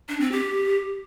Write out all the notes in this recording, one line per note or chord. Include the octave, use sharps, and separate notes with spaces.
D4
C4
G4